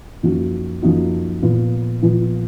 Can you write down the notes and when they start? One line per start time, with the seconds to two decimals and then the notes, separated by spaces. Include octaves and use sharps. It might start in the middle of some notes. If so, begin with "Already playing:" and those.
0.23 F#2 F3 A#3 D#4 F#4
0.82 F#2 F3 A#3 D#4 F#4
1.43 A#2 F3 B3 F4
2.02 A#2 F3 B3 F4